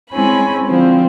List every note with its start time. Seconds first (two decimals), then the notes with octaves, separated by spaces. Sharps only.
0.11 G#3 C4 C#4 E4 G#5 B5
0.66 D3 F3 C4